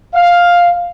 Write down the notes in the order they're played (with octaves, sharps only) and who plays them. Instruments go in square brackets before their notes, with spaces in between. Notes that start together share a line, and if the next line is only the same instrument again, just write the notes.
[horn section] F5